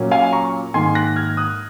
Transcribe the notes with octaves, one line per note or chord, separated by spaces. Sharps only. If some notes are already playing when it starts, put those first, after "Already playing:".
Already playing: A#2 F#3 A#3 C#4
F5 G#5
A#5 C#6
G#2 D#3 A#3 G#5 C6
F#6 A#6
F6 G#6
D#6 F#6